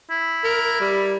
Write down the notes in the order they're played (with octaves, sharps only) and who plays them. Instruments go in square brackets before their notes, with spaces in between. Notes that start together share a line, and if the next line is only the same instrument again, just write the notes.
[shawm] E4
[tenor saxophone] A#4
G3